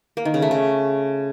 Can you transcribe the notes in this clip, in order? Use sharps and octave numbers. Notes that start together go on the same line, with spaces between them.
A#3
D#3
C#3
A3
C#3